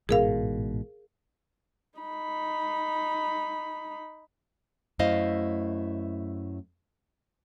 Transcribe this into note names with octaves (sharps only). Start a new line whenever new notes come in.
A1 G#2 B2 G#4 A#4 F5
D#4 B5
F#2 A3 E4 C5 D#5 F5